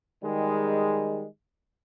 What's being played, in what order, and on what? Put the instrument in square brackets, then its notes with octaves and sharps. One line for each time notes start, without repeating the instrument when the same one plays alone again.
[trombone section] D#3 G3 G#3